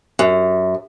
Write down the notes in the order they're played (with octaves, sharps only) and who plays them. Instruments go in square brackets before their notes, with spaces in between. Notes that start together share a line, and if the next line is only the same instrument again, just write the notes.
[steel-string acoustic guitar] F#2